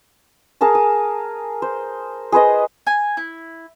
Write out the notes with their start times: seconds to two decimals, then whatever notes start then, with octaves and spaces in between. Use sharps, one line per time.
0.61 G#4 A#4 F5 A5
0.75 D#6
1.62 C5
2.32 G#4 B4 C5 D#5
2.87 G#5
3.17 E4